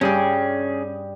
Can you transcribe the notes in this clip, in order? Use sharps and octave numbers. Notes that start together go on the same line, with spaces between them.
G2 C#4 G4 G#4